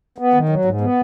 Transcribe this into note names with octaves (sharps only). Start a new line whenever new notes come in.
B3
D#3
F#3
G#2
B3